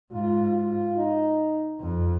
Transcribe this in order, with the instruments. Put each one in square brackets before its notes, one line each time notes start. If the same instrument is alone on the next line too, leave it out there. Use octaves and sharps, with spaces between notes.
[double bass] G#2 [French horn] F4
[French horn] F4
D#4
[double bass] F2